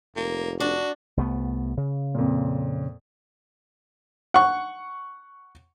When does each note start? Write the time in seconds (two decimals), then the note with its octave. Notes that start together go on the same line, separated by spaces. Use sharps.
0.16 F1 A#3
0.60 D4 F#4
1.17 C2 A3 B3
1.77 C#3
2.15 F2 A#2
4.34 F#5 C#6